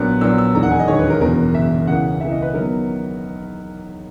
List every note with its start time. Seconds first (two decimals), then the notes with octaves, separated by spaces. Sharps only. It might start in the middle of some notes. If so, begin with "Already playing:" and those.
Already playing: A#1 A#2 F#3 B3 F#6
0.21 A#1 A#2 F#3 B3 E6
0.38 E6
0.55 E1 D#2 D#3 A#5
0.63 F#5
0.71 G#5
0.79 D#5
0.88 E1 D#2 D#3 C#5
0.99 B4
1.10 A#4
1.21 F#1 E2 B2 A#4
1.54 F#1 E2 B2 E5
1.87 C#2 C#3 E3 A#3 F#5
2.20 C#2 C#3 E3 A#3 E5
2.31 D#5
2.42 B4
2.54 D#3 F#3 B3 A#4